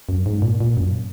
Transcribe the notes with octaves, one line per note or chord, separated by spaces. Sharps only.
F#2
G#2
A#2
A#2
F#2